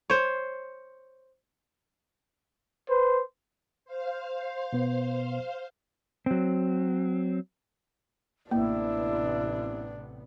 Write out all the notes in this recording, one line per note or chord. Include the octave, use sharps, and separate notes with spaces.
C5 C#5
B4 C5
C5 F5
B2 B3
F#3 C4
A1 C3 A#3 B3 D4 E4